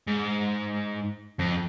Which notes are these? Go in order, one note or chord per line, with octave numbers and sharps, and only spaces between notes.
G#2
F2